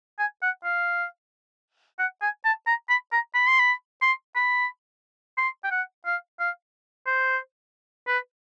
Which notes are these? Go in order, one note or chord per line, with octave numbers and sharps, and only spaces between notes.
G#5
F#5
F5
F#5
G#5
A5
A#5
B5
A#5
B5
C6
B5
C6
B5
C6
G5
F#5
F5
F5
C5
B4